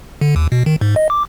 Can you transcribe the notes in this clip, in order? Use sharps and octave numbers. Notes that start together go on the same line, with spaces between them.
D3
D#2
B2
D#3
G#2
D#5
D6